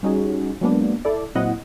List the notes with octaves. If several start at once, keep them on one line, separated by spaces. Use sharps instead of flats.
G3 C#4 D#4 F#4 G#4
F#3 G#3 A#3 B3 D4
E4 A4 D5
A#2 F#3 C4 E4 D#5 F#5